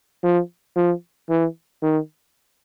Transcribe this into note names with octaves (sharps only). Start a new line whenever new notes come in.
F3
F3
E3
D#3